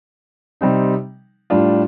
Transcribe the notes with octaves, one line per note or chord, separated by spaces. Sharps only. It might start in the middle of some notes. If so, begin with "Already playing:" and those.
C3 G3 C4 D#4
A2 G3 D4 F4